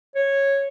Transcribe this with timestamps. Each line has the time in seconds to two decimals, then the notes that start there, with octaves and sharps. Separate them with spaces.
0.15 C#5